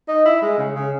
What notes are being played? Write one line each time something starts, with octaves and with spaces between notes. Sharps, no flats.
D#4
E4
G#3
C#3
C#3